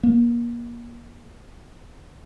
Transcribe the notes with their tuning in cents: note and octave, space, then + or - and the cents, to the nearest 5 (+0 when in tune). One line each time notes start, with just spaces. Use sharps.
A#3 +30